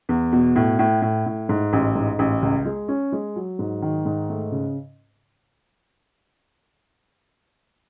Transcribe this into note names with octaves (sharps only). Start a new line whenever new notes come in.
E2
B2
A2
A2
A2
A2
G#2
A1
G#2
A1
C#2
G#3
C#4
G#3
F#3
G#2
D#3
G#2
A3
C#3